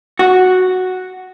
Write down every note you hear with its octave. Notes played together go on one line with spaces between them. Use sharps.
F#4